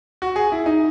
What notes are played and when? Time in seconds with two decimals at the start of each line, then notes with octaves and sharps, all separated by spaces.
0.22 F#4
0.36 G#4
0.52 E4
0.66 D#4